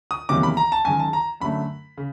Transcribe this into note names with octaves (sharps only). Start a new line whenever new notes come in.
D#6
E2 C3 D#3 F#3 A#3 D6
B5
A#5
A5
F#2 D#3 G#3 G#5
A5
A#5
F#2 D3 F#3 A3 B5
C#3